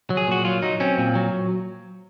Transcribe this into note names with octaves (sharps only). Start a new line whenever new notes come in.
F#3
G#4
A#2 F#4
F#3 F4
F#3 D#4
C4 C#4
A#2
F#3